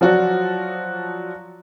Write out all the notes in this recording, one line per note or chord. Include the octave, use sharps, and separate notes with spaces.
F3 F#3 F#4 D5